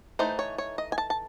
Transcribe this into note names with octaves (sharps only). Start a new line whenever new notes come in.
E3 A3 D#4 C5
C#5
C#5
D#5
G#5
A5
A5